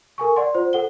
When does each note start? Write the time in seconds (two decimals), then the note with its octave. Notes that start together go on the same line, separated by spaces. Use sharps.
0.18 A4 A#4 G#5 C#6
0.36 D5 F#5 C6
0.55 F4 C5
0.73 A4 F#5 G7